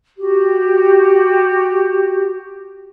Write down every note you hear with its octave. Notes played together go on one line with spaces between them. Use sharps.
F#4 G4